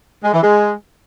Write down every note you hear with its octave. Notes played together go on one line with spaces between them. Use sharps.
G#3
E3
G#3